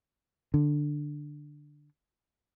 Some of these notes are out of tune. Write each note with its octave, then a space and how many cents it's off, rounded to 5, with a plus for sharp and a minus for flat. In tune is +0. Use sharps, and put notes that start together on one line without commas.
D3 +5